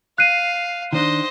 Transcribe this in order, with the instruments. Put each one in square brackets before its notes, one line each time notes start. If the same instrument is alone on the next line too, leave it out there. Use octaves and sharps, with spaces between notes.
[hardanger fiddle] F5 [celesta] F#6 C7 D#7
[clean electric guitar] D#3 D4 [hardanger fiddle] C5 D#5